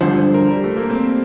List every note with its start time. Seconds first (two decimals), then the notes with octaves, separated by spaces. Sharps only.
0.01 G2 D3 F3 C5
0.34 A#4
0.50 G3
0.64 A3
0.77 A#3
0.90 C4